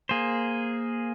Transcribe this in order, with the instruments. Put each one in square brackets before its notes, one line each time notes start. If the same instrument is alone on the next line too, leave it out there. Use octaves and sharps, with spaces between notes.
[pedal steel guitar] A#3 G#4 C5